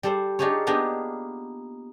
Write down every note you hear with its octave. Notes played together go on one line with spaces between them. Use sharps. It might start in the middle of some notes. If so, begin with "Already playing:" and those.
G3 A4 C5
D4 D#4 F4 G4 G#4 C#5
A#3 B3 D4 D#4 G4 G#4